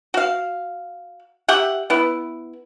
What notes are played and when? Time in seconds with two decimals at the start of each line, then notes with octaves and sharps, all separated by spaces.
0.14 F#4 F5
1.48 G4 E5 F#5
1.90 B3 E4